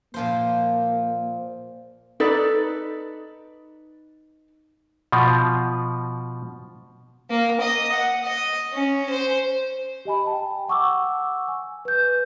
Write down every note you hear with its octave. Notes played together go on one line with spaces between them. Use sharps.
A#2 F3 A#3 C5
D#4 A4 B4 D5
B2 F3
A#3
D#5
F#5
D#5
C#4
C5
G4 D#5 G#5 B5
G5 A5
F#5 C#6 D6 E6
G#5
B4 G6